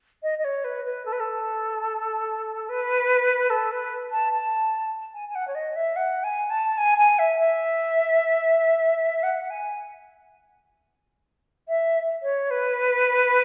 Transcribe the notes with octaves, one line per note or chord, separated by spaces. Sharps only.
D#5
D#5
C#5
B4
B4
A4
B4
A4
B4
A4
B4
A5
A5
G#5
G#5
F#5
C#5
D#5
E5
F#5
G#5
A5
G#5
G#5
E5
E5
F#5
G#5
E5
C#5
B4